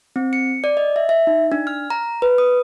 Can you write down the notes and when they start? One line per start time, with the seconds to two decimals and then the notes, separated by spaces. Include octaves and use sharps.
0.16 C4
0.33 C#7
0.64 D5
0.77 D#5
0.96 E5
1.09 E5
1.27 D#4
1.52 D4
1.67 F6
1.90 A#5
2.22 B4
2.38 D#6